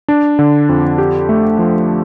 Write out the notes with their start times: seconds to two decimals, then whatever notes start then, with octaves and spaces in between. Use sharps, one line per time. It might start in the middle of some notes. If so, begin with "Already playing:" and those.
0.08 D4
0.39 D3
0.69 F2
0.98 G4
1.29 A3
1.58 F3